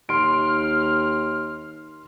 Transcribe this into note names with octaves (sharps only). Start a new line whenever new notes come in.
D#2 C6 F6 D7